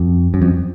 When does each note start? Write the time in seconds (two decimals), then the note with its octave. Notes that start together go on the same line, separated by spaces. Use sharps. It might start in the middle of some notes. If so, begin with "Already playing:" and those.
Already playing: F2
0.34 F#2
0.42 F2